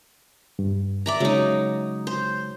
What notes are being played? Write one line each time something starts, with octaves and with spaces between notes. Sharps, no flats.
G2
D5 E5 A#5
C#3 F#3 G#3 D#4
C5